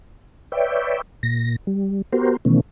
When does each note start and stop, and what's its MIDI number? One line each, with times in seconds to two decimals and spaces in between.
0.52 1.02 71
0.52 1.02 73
0.52 1.02 74
0.52 1.02 76
0.52 1.02 79
1.23 1.56 46
1.23 1.56 94
1.67 2.02 55
2.13 2.37 59
2.13 2.37 66
2.13 2.37 67
2.13 2.37 70
2.13 2.37 72
2.45 2.61 47
2.45 2.61 51
2.45 2.61 52
2.45 2.61 57
2.45 2.61 59
2.45 2.61 61